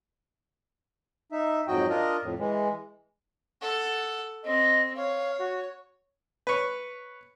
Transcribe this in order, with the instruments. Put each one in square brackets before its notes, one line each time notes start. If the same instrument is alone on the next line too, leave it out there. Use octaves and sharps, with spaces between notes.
[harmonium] D#4 E5
F2 G#2 F#3 F#4 D#5 G5
D4 F4 A#4 D#5
F2 A2
E3 G#3
[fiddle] A4 F#5
[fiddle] C4 [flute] D#5
[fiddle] C#5 [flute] F5
[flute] F#4
[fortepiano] B4 C#5